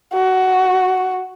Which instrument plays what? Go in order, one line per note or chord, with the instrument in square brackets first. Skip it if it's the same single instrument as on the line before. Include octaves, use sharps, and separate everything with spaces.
[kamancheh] F#4